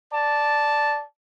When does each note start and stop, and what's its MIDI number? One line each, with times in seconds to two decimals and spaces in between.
0.11 1.02 74
0.11 1.02 81